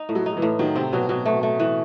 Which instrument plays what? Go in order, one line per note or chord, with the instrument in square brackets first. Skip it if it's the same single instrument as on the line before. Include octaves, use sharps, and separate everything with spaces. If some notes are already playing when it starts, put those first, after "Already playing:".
Already playing: [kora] D#4
A2
[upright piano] F#3
[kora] D#4
[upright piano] F#3
E3
[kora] A2
[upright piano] D#3 [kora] F#3
[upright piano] C3 [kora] C4
[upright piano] B2 [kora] F#3
[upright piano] B2 [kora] F#3
[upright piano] B2 [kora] A3
[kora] A3
E3